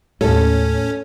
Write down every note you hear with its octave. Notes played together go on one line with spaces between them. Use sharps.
D#2 A2 C#4 A4